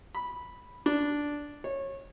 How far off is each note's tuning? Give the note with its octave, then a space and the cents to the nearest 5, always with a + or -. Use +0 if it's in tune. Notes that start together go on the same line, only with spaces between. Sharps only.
B5 -5
D4 -5
C#5 -20